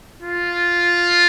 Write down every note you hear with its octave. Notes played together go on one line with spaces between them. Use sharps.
F4